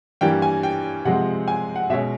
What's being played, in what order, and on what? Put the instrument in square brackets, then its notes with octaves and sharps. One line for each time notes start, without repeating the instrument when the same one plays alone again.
[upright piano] G2 E3 G3 A#3 G5
G#5
G5
C3 F3 G#3 F#5
G#5
F#5
B2 G#3 C#4 E5